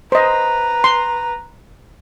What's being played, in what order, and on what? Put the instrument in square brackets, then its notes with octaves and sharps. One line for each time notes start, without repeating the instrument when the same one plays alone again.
[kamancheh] B4 A#5 [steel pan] C5 D#5
[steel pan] C6